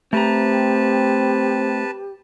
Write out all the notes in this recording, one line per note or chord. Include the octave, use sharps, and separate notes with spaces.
A3 C4 G4 B4 A5 A#5